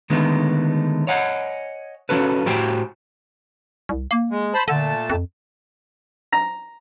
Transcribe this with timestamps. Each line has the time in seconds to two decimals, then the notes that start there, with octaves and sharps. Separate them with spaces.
0.10 D3 D#3 G#3 A3 B3
1.07 C#5 D#5 F#5 G#5
2.09 F3 C#4 F#4 A4 B4
2.46 A2 F#4 G4 C5 G5 G#5
3.89 C2
4.11 A#3
4.31 G#3
4.54 C5 A5 B5
4.68 A#2 D3 A3 A5
5.10 F2
6.33 A#5